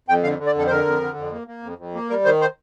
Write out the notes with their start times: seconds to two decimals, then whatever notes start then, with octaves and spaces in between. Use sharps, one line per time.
0.08 F2 G5
0.24 D3 F5
0.39 D3
0.46 D5
0.54 F2 A4
0.67 C5
0.70 D3 A#4
0.85 F2
1.02 D3
1.17 F2
1.32 A#3
1.47 A#3
1.63 F2
1.78 F2
1.94 A#3
2.10 G3 A#4
2.25 D#3 C5
2.41 C5